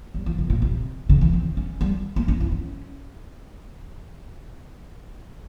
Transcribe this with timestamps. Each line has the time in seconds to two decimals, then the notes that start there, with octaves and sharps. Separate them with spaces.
0.14 G3
0.26 F3
0.38 C#3
0.50 A#2
0.62 C3
1.09 C#3
1.21 E3
1.33 C4
1.57 C#4
1.81 G3
2.16 A#3
2.28 C#4
2.41 E4
2.52 C#4